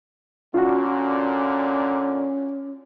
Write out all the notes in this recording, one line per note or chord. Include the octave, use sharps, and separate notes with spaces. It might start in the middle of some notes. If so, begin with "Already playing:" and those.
A#2 D3 C#4 F4 F#4